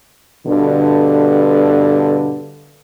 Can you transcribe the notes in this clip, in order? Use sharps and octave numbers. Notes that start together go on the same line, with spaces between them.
G2 B2 D3